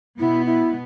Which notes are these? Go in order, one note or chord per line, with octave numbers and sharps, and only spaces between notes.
B2 B3 E4
E4